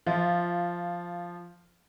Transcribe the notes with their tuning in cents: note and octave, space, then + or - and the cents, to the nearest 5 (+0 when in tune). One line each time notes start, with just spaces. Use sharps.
F3 +0 F4 -10 E5 -40